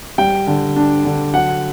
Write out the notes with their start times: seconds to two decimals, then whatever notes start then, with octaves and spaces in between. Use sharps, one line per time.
0.18 G3 G5
0.47 D3
0.76 D4
1.05 D3
1.34 F#3 F#5